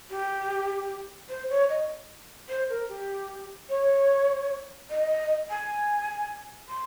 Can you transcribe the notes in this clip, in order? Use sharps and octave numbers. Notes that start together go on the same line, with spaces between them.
G4
C5
C#5
D#5
C5
A#4
G4
C#5
D#5
G#5
C6